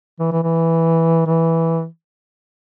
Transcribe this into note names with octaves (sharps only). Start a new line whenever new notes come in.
E3
E3
E3
E3